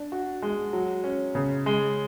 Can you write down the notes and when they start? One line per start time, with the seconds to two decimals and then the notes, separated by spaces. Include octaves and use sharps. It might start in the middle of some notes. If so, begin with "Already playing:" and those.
Already playing: D4
0.12 F#4
0.42 G#3
0.73 F#3
1.04 C#4
1.35 C#3
1.66 G#3